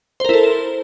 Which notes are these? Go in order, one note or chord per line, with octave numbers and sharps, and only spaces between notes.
E4 A4 A#4 C5